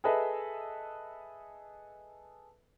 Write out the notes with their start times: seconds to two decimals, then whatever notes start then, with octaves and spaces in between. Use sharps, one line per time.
0.04 G#4 A4 B4 D#5 E5